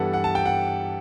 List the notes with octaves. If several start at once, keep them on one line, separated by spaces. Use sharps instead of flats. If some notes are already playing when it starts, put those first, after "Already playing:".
Already playing: G2 E3 G3 B3 A4 F#5
F#5
A5
G5
F#5